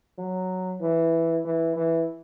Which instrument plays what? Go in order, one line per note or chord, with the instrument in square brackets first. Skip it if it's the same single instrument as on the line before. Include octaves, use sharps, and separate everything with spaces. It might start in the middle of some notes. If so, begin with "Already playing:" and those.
[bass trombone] F#3
E3
E3
E3